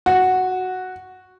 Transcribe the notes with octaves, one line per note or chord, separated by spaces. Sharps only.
F#4